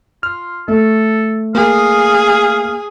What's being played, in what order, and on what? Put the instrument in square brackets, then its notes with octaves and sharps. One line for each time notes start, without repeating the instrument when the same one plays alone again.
[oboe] F4 [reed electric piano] F6
[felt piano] A3 [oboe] A4
[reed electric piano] A#3 [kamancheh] G#4 [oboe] F5